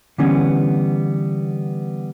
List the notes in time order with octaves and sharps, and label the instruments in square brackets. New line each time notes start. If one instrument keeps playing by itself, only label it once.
[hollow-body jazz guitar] D3 E3 G3 B3 C#4